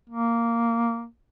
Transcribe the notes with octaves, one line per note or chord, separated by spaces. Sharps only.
A#3